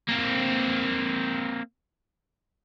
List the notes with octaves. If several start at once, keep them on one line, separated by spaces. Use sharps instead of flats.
A#3 C4